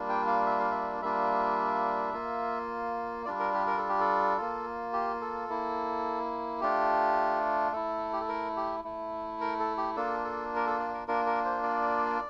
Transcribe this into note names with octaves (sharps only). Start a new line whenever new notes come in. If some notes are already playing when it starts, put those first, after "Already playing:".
Already playing: G3 A#3 D4 F4
G5
F5
E5
F5
E5
G3 A#3 D4 F4 E5
A#3 F4
G3 D4 F4 D5
A#4
G4
A#4
A4
G4
A4
A#3 F4
G4
A4
A#3 E4
A3 D4 F4 G4
A3 E4 A4
G4
A4
A#4
G4
A3 E4
A#4
A4
G4
A#3 D4 F4 A4
A4
A#4
A4
D5
A#4
A#3 D4 F4 A#4
A#4
C5
D5